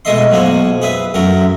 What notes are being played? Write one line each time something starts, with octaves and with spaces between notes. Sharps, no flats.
B2 G#3 A3 D#5 E5 C6
B1 F3 A#3 F#4 G#5
G#4 B4 E5
F#2 F#3 A3 A#4